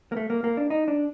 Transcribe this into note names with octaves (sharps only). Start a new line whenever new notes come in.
A#3
A3
A#3
A#3
D4
D#4
D4